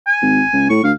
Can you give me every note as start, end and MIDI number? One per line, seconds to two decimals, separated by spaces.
0.07 0.69 80
0.22 0.42 32
0.53 0.65 37
0.70 0.82 45
0.70 0.82 85
0.83 0.92 38
0.83 0.92 77